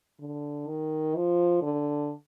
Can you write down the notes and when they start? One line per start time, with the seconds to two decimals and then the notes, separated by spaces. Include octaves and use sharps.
0.20 D3
0.67 D#3
1.15 F3
1.62 D3